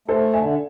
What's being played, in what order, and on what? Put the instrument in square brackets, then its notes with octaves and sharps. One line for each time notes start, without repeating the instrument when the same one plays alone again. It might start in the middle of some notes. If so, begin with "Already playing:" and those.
[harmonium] A3 [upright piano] A4 C5
[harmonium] D3 [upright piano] E5 G#5